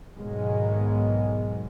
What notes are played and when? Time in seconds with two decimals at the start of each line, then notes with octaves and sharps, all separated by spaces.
0.15 B1 G#2 D#3 F#3 G#3 B3